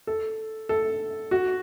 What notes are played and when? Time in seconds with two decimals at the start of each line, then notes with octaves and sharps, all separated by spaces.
0.07 A4
0.69 A4
1.31 F#4